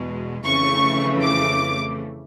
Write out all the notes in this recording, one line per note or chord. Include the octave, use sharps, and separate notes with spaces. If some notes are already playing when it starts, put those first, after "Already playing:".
Already playing: E2 B2 G#3
F2 C#3 E3 A3 C#6
D6